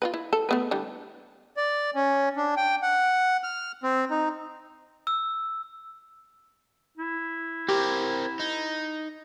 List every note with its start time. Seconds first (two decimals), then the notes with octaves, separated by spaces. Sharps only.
0.02 F4 F#4 B4
0.14 E4
0.33 A4
0.49 A3 B3 B4
0.71 D3 E3 G3
1.57 D5
1.95 C#4
2.36 D4
2.57 G5
2.82 F#5
3.43 F6
3.83 C4
4.11 D#4
5.07 E6
6.97 E4
7.69 C4 G4 A#4
8.39 D#4